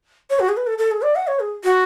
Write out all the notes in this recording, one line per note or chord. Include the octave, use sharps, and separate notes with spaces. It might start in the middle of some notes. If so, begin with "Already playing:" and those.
C#5
F#4
G#4
B4
A4
A4
G#4
D5
F#5
C#5
G#4
F#4